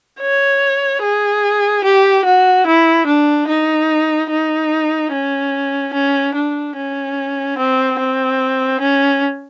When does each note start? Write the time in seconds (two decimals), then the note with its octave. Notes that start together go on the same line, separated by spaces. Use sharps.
0.21 C#5
1.02 G#4
1.84 G4
2.25 F#4
2.66 E4
3.07 D4
3.48 D#4
4.30 D#4
5.12 C#4
5.93 C#4
6.34 D4
6.76 C#4
7.58 C4
7.99 C4
8.80 C#4